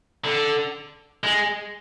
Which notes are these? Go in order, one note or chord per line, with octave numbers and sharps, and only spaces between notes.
D3
G#3